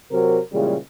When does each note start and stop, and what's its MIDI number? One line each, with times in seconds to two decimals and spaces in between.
0.11 0.39 48
0.11 0.39 54
0.11 0.39 70
0.52 0.76 46
0.52 0.76 49
0.52 0.76 52
0.52 0.76 55
0.52 0.76 56